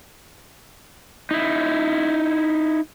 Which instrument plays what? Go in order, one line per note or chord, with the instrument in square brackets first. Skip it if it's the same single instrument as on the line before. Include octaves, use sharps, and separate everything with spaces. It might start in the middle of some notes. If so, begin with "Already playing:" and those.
[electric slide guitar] D#4 E4